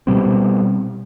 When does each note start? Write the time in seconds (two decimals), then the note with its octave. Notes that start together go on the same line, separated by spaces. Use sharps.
0.07 B2 G3 C4